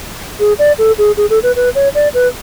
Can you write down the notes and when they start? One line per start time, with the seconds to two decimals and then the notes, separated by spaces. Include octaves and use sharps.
0.40 G#4
0.59 D5
0.78 A4
0.98 G#4
1.17 G#4
1.30 A4
1.43 B4
1.56 B4
1.75 C#5
1.95 D5
2.14 B4